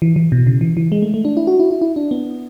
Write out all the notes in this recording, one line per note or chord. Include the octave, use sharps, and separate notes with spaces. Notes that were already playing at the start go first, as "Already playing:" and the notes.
E3
E3
B2
C#3
E3
E3
G#3
A3
A3
D4
E4
F#4
E4
E4
E4
D4
B3